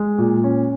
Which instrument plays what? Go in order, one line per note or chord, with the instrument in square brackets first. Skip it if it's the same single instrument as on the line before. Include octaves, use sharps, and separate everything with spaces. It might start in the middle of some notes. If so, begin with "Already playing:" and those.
Already playing: [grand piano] G#3
A#2
C#4